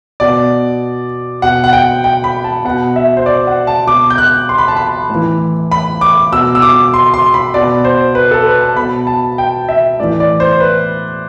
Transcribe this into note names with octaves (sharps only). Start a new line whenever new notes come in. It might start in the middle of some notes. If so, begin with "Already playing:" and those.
B2 D5
B2 F#5
F#5
G5
G5
B5
A5
B2 F#5
E5
C5
D5
F#5
A5
B2 D6
G6
F#6
C6
B5
A5
B5
A2 E3
B5
D6
B2 E6
E6
D6
C6
C6
B5
B2 D5
C5
B4
A4
B4
A5
B2 B5
A5
G5
E5
A2 E3 D5
D5
C5
B4